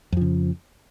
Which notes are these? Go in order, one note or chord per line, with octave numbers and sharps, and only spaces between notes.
F2 C#3 F3